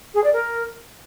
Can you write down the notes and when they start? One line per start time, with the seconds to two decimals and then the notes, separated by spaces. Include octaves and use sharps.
0.14 G#4
0.23 D5
0.33 A#4